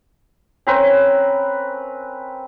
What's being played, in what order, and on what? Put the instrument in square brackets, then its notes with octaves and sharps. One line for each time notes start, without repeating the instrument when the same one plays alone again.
[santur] C4 C#4 A#4 B4